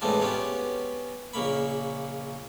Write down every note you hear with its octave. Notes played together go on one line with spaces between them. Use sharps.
A2 E3 G#3 C4 D4 F4
B3 C#4 G4 C#5
A#1 C#3 A#3 B5